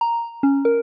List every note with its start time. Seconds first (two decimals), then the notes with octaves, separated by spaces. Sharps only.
0.01 A#5
0.43 C#4
0.65 A#4